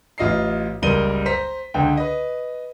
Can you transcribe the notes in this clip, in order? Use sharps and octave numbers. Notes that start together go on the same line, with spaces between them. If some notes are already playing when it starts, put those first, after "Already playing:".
A1 F4 D#5 E5 C7
F#1 C#2 G3 A#4 D#7 G7
C5 A#5 B6
C#2 D3 G5
B4 D#5